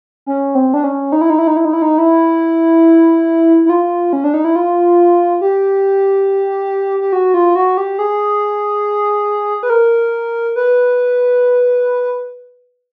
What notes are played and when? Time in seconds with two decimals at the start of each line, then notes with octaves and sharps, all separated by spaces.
0.26 C#4
0.55 C4
0.74 D4
0.84 C#4
1.12 D#4
1.21 E4
1.30 D#4
1.39 E4
1.47 D#4
1.57 E4
1.65 D#4
1.73 E4
1.82 D#4
1.98 E4
3.66 E4
3.70 F4
4.13 C#4
4.24 D4
4.34 D#4
4.45 E4
4.56 F4
5.41 G4
7.01 G4
7.13 F#4
7.34 F4
7.55 F#4
7.77 G4
7.99 G#4
9.63 B4
9.70 A#4
10.56 B4